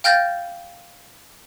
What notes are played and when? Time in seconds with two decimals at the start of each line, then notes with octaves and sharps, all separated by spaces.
0.04 F5 G5 F6 G6 A6 A#6